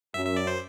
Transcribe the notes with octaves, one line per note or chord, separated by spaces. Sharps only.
F#2 E5
E5
D5
C5